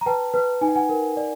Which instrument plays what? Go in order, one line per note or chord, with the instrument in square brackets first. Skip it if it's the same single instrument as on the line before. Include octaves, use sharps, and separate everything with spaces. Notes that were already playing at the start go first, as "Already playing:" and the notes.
[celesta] A#5
B4 G5 A5
B4
D#4 G#5
G5
F#5 G#5
A#4
D5